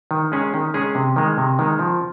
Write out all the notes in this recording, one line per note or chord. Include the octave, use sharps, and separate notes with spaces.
D#3
G#3 C#4 G#4
D#3
G#3 C#4 G#4
C3
D#3 G#3
C3
D#3 G#3
F3